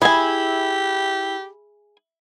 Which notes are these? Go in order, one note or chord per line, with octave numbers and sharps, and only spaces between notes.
E4 G4 G#4 G#5